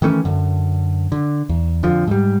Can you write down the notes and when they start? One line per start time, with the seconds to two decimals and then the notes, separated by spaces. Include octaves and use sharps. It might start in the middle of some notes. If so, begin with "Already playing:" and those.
0.02 D#3 E3 A3 C#4
0.25 F#2 D3
1.12 D3
1.49 E2
1.83 F2 D3 F3
2.07 G#2 G3